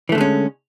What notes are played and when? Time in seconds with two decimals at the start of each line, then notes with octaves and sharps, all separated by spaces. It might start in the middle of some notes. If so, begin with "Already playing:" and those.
0.09 E3
0.12 A3
0.15 D3
0.18 G#3
0.21 C#4